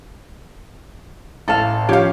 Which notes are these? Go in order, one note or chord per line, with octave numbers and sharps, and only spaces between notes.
A1 A4 F5 A5 E7
F3 C#4 G4 C#5 F5